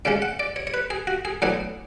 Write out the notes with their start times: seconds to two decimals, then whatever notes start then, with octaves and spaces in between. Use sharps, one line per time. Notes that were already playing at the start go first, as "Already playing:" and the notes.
0.05 D2 C#3 G#3 C#4 D5
0.22 F#5
0.40 D5
0.56 C#5
0.67 C#5
0.74 B4
0.90 G#4
1.07 F#4
1.25 G#4
1.42 A2 F#3 B3 D4 G#4